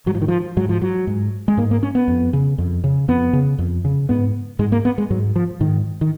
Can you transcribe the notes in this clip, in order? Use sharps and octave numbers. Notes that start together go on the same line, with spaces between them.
G#2 F#3
F3
D#3
F3
G#2 F#3
F3
F#3
G#2
G#3
G#2 A#3
A#3
C#4
B3
F2
C#3
F2
C#3
F2 B3
C#3
F2
C#3
G#2 B3
G#2 G#3
A#3
B3
G#3
G#2 F#3
F3
G#2 D#3
D#3